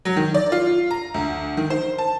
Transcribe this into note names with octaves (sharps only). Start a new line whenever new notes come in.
F#3
D#3
D5
F4
A#5
D2
D#3
C5
A5